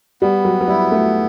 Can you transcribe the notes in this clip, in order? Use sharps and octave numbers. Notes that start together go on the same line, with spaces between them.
G3 B3
F#3
F#3
G3 E4
A3